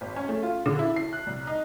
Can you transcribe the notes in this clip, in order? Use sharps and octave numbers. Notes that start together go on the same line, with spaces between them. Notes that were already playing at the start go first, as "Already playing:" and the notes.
G#1
C#4
A3
F4
D3
E4
C7
F#6
C2
D#4